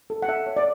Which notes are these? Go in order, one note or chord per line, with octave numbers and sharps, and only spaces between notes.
A4
F#5
A4 E5
C#5
D5